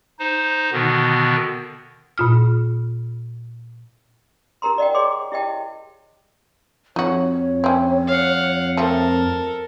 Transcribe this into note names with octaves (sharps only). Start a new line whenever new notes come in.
D#4 C5
B2 D3 D#3 B3
A#2 F4 F6
D#4 G4 A#4 A#5 C6
D5 D#5 F#5 G5
G#4 C#5 C6 D6
E4 G4 D#5 G5 A5
F2 D#4 F#4 C#5
C4 C#4
F5 F#5
F3 G3 A3 A4 A#4